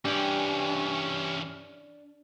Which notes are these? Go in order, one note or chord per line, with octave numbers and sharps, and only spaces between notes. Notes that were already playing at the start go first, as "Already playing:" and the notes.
G2 E3 C#4 D4 G4 G5